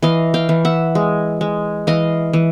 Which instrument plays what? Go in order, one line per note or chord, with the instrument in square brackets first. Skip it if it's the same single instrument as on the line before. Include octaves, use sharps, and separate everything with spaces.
[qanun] E3 D#5 F5
F5 G5
E3
E5 F#5
G#3
G#3
E3 D#5 F5
E3